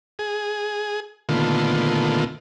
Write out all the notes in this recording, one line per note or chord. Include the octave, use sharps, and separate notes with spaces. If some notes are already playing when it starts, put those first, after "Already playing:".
G#4
A#2 D3 D#3 A3 B3 F4